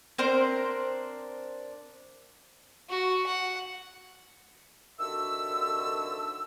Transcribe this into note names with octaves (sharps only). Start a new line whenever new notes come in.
C4 D4 A#4 C5
F#4
F#5
C2 D3 D#3 F#4 E5 E6